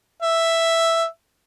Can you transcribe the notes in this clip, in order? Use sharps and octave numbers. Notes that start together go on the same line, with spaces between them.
E5